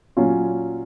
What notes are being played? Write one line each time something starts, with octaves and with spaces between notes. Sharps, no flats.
A#2 F#3 C#4 F4